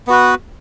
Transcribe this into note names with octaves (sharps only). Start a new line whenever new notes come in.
B3 F#4 B4